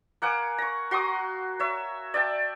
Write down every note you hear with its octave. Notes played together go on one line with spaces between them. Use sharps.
A#3 F#5 G#5 D6
A#5 C#6
F#4 C6 D6 D#6
C#5 E5
D5 E5 G5 A5